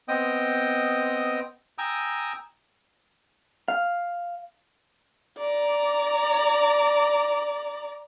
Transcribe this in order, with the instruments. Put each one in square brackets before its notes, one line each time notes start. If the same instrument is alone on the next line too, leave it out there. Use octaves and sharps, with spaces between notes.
[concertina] B3 C4 D#5 G5 D#6
G5 G#5 A#5 D#6 E6
[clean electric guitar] F5
[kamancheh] D5 A#5